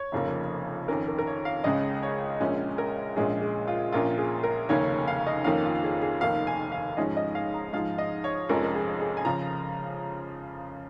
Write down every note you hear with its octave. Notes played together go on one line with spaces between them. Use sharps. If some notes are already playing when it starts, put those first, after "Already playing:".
Already playing: C#5
F1 F2 C#3 F3 A#3
F2 D#3 C#4 A#4
A#4
A#4
C#5
F5
C#2 C#3 G#3 C#4 D#5
C#5
A#1 A#2 G#3 C#4
A#4
A#1 A#2 G#3 C#4 G#4
G#4
F4
A#1 A#2 A#3 C#4 F4
G#4
A#4
F1 D#2 C#3 A#3 C#4 C#5
F5
D#5
F2 D#3 A#3 C#4 F5
F4
G#4
G#4
F1 D#2 D#3 A#3 F5
G#5
F5
G#2 F3 G#3 C#4 D#5
D#5
F5
A#5
G#2 F3 G#3 F5
D#5
C#5
F1 F2 F3 G#3 C#4 A#4
A#4
G#4
G#4
G#5
C#3 F3 A#5